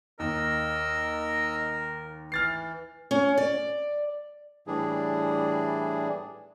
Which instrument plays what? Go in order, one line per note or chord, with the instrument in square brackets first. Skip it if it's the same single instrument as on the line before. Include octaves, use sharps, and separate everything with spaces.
[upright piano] D#2 [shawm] A#4 [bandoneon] D#5 E6
[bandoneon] E3 [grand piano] F6 A6 C7
[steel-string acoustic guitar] C#4
D5
[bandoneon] A2 E3 G3 D4 G#4